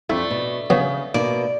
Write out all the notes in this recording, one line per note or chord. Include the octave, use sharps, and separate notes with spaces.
F2 A3 D4 E4
B2
C#3 F#3 B3 G#4
B2 A#3 D5